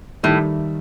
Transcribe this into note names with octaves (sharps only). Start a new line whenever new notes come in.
A2 D#3 G3